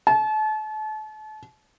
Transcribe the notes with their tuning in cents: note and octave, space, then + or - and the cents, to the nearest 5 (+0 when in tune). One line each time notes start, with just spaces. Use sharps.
A5 -35